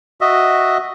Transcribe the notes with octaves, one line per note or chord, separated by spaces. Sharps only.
F#4 D#5 E5